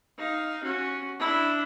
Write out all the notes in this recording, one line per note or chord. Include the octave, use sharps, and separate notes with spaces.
D#4 F5
C#4 F#4
D4 E4